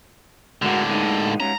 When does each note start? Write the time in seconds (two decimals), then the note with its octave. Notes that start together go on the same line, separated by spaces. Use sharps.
0.62 A2 D3 G#3 F#4 A#4
0.88 G#3 A#3 D#4
1.40 G#2 C#4 A#5